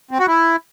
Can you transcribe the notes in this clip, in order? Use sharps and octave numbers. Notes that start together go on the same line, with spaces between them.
C4
F#4
E4